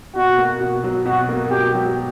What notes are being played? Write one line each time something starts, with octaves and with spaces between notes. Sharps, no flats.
B2 F#4
A#3
B2
F#3
B2 F#4
A#3
B2 G4
F#3